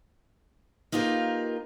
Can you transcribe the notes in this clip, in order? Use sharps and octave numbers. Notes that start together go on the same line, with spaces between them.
A#3 D#4 F4 G4 A#4 B4